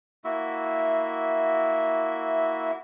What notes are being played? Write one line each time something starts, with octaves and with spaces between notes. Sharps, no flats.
A#3 E4 F#4 E5